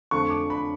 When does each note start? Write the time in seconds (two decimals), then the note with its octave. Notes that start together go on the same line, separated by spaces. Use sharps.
0.11 F2 D3 F3 A3 C#6
0.30 D6
0.50 B5